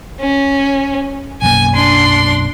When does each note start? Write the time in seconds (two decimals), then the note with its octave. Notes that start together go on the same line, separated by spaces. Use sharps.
0.21 C#4
1.42 B1 F#2 A#3 G#5
1.75 D4 C6